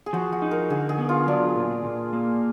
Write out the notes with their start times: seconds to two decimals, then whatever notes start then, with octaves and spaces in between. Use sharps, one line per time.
0.06 G#4
0.13 F3 F#4
0.32 F#4
0.42 D#4
0.51 A#4
0.70 D3 G#4
0.89 G#4
0.98 B3
1.09 F4
1.27 F#3 D4
1.56 A#2
1.85 A#2
2.13 A#3